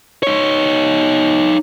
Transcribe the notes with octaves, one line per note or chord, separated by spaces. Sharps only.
D#4 C#5